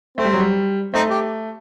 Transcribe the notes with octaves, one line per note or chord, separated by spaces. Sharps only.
A3 C4
G3
F#3
G3
A3 C4 D#4
G4